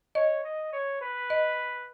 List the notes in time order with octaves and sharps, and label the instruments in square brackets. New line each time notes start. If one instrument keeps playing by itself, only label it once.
[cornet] C#5 [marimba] D#5
[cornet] D#5
C#5
B4
[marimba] D#5